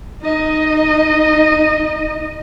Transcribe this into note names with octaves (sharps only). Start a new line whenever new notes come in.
D#4 D#5